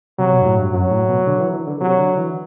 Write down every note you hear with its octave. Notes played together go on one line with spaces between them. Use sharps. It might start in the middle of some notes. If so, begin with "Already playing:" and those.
C3 F#3
B2
G2
A2
G2
F#2 F#3
A2
B2
D3
E3
E3
D3
C3 F#3
D3
E3